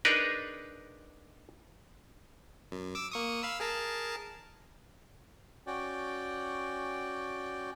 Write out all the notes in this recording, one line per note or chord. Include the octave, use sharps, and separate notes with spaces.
D4 D#4 G#4 A#4 B4
F#2
D6 E6
A#3 C#6 D#6
F5 B5 E6
G#4 A#4 A5
C#4 F#4 D5 G5